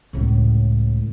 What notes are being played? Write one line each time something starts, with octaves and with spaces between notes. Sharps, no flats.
C#2 A2